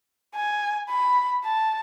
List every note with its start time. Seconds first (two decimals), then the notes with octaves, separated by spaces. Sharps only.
0.35 G#5
0.90 B5
1.45 A5